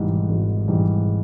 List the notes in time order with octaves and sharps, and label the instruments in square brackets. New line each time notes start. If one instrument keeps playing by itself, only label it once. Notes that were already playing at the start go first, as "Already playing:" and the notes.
Already playing: [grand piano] G#1 G#2 E3 G3
G#1
G#2 E3 G3